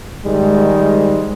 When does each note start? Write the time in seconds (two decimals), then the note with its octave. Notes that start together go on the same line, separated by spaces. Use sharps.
0.25 G#2 D#3 G3 G#3